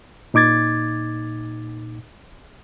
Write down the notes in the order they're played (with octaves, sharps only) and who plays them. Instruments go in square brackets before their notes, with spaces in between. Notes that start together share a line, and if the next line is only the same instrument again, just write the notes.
[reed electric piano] A#2 D#4 D6 G#6 A6